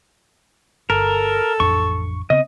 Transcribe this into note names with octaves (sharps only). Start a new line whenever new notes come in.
G1 A4 A#4
A1 F2 D4 C#6
C#3 B3 C4 D#5